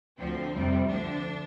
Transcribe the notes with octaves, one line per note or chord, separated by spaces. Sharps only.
D2 D3 F3 C4
F2 C3 G3
D2 D3 F3 D4